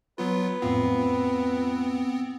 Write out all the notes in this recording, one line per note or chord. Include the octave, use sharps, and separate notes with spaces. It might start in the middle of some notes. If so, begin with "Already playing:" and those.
F#3 B3 F4 B4
F2 A2 B3 C4 F4